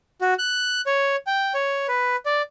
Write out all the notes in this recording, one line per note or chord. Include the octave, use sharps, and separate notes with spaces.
F#4
F#6
C#5
G5
C#5
B4
D5